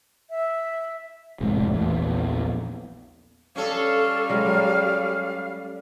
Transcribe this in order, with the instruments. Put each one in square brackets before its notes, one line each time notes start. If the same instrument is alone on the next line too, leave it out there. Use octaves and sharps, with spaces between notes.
[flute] E5
[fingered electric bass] F1 A2 G#3
A#1 E2 E3
[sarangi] G3 [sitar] C#4 A4 [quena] F5
[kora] F#3 G#3